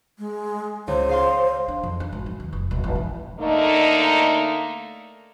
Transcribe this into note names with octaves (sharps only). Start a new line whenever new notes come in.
G#3
C#2 C5
G#4 F5 C6
D4
F2
D4
G#1
F#2
D#2
F1
D#1
G#1
D#3
D3 A3 A#3 D#4